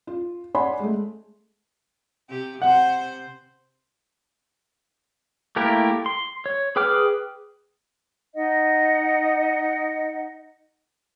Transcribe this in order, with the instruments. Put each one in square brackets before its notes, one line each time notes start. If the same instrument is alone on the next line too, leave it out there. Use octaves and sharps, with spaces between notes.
[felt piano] F4
C#5 D5 F#5 G#5 B5 C6
G#3 A3
[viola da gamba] C3 G4
[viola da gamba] C3 C5 [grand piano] F#5
[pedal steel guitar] A3 A#3 E4 G4 A#4
C6
C#5
G#4 B4 G5 D6 F6
[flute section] D#4 D#5 F#5